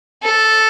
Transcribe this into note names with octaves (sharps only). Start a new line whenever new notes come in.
A4